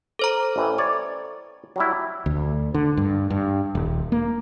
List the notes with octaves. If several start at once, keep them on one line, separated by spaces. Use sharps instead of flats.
A4 C5 A#5
A1 A2 E3
C#5 D5
F#3 G3 E4
D2
D3
G2
G2
D#1
A#3